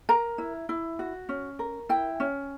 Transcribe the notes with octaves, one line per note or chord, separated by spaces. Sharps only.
A#4 A#5
E4
E4
F#4
C#4
A#4
E4 G5
C#4